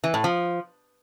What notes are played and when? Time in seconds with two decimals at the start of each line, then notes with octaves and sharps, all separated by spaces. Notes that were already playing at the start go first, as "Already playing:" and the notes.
0.04 E3
0.14 A2
0.24 F3